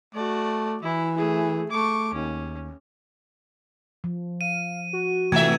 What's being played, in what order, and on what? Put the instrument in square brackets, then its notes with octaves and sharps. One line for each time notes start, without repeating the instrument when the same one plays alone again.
[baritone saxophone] A3 [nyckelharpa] F#4 D5
[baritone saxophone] E3 [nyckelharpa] E4
[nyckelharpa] A3 G#4
[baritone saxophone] A3 [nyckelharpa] C#6 D6
[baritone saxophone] D#2 [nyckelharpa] C#4
[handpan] F3
[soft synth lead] F5 [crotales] D#7
[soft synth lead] F#4
[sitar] A2 E5 [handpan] C3 E3 A3 [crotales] G#6 E7